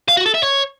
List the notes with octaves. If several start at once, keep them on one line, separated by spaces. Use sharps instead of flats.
F5
F#4
A4
E5
C#5